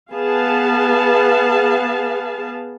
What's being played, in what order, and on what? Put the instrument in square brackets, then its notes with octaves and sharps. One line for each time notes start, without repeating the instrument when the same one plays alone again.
[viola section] B3 G#4 F5 A5